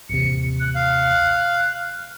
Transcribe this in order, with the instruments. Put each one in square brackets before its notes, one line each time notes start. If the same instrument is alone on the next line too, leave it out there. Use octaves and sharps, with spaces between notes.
[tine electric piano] A1 D#2 C3 [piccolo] C#7
[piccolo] F#6
[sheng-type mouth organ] F5
[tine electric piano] F6